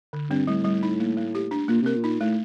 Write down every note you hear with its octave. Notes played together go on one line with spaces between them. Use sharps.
D3
G2 C4
A2 G3
G3
D#4
A#3
A3
G4
D4
A#2 A#3
C3 A#4
A#2
D#4
A2 A3